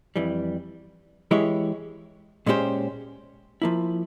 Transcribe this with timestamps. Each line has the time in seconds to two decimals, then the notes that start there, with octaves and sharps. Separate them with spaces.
0.16 F2 E3 G3
1.31 E3 G#3 E4 G4 C#5
2.46 A#2 G#3 C#4 G4 C5
3.62 F3 A#3 E4